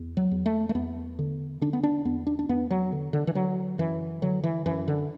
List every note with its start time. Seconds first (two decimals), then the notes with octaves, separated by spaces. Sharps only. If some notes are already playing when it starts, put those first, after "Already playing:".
Already playing: E2
0.17 F#3
0.31 E2
0.46 A3
0.69 A3
0.75 E2 B3
1.19 D3
1.61 D3 D4
1.73 B3
1.83 D4
2.05 E2 B3
2.27 D4
2.39 D4
2.49 E2 B3
2.71 F#3
2.92 D3
3.13 D3
3.27 E3
3.35 D3 F#3
3.78 F#2 E3
4.22 D3 F#3
4.44 E3
4.66 F#2 E3
4.88 D3